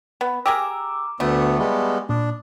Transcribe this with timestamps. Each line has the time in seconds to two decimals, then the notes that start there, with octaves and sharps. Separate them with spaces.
0.21 B3
0.46 G4 G#4 A#4 D6 E6
1.20 D2 A3 B3
1.59 G3 G#3 B3
2.09 A#2 D4